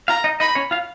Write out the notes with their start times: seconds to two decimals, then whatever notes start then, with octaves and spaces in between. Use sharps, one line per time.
0.08 F4 F5 A#5
0.24 D#4 D#5
0.40 D#4 D#5 B5
0.55 C#4 C#5
0.71 F4 F5